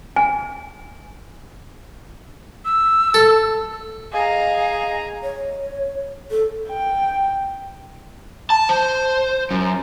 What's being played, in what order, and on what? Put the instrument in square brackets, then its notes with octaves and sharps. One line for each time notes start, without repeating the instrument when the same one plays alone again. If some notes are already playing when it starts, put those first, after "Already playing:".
[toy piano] G#5
[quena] E6
[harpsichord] A4
[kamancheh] G#4 A#5 [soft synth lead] D#5 [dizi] F5
[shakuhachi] C#5
A4
[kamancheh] G5
[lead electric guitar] A5
C5
F#2